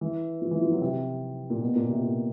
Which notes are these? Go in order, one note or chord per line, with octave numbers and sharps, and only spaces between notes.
E3
F3
E3
F3
F#3
C3
A#2
B2
A#2
C3
A#2